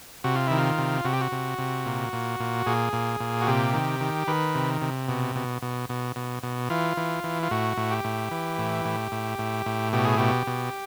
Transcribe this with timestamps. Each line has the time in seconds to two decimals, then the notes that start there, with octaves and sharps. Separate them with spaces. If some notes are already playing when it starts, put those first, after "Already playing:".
0.24 C3 F#4
0.36 F4
0.47 D#3 E4
0.58 F4
0.78 C3
1.05 C3 F#4
1.13 G4
1.21 F#4
1.32 C3
1.58 C3
1.86 A#2
2.13 A#2
2.40 A#2
2.66 A#2 G#4
2.93 A#2
3.20 A#2
3.41 F#4
3.47 C3 G4
3.74 D#3
4.00 D#3
4.27 D#3 B4
4.55 C3
4.82 C3
5.08 B2
5.36 B2
5.62 B2
5.89 B2
6.16 B2
6.43 B2
6.70 E3 F4
6.97 E3
7.24 E3
7.43 F4
7.51 A2 F#4
7.77 A2
7.91 G4
8.04 A2
8.31 E3
8.58 A2
8.85 A2
9.12 A2
9.39 A2
9.66 A2
9.93 B2 G4
10.05 G#4
10.18 B2 G4
10.47 B2